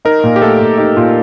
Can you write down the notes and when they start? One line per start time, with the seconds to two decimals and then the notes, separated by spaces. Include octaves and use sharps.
0.05 D#4 A#4
0.23 A#2
0.36 G4
0.42 A3 A4
0.61 A#2
0.78 D#4 G4
0.97 A#2 F4